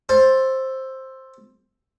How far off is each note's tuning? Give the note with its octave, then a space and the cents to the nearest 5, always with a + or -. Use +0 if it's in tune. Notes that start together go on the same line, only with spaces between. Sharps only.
A4 +0 C5 +10